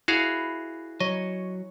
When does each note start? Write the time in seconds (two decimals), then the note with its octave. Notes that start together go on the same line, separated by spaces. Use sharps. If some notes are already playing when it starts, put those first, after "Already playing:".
0.08 E4 F#4 G#4 F5
1.00 F#3 C#5 D#5